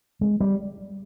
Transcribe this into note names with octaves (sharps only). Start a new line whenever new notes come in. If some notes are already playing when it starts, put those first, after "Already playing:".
G#3
G3